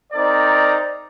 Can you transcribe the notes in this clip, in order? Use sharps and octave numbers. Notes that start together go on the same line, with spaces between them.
C4 D#4 A#4 D5